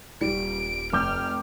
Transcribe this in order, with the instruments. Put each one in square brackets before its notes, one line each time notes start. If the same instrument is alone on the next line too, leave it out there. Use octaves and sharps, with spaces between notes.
[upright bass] D#1 [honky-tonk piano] G3 [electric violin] D7
[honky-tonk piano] F1 D6 G6 [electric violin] F6